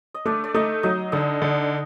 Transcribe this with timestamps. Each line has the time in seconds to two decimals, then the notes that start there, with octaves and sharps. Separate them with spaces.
0.14 D#5
0.25 A3 D4 D5
0.44 D5
0.54 A3 D#4 D#5
0.83 F#3 D#4 D#5
1.12 D3 D#4 D#5
1.42 D3